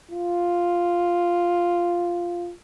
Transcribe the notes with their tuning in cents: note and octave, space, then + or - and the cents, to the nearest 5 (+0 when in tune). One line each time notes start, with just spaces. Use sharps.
F4 +0